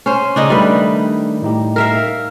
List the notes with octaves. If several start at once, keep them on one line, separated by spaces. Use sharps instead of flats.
C#4 C5
C#3 D4 D#4 D#5
D#3 G3 A3 D4 B4
A2 D#4 G4
A#4 E5 F5